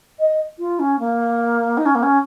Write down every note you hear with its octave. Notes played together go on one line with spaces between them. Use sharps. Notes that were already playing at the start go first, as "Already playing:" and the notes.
D#5
F4
C#4
A#3
D#4
C#4
A#3
C#4